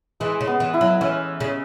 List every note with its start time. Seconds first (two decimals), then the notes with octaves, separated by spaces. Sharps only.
0.20 E3 G#3
0.41 C#3
0.47 B3
0.60 E3
0.74 E4
0.81 F#3
1.01 E3 C#4
1.40 C#3